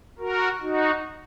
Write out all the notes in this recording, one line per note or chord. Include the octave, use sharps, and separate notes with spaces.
F#4 A#4
D#4 F#4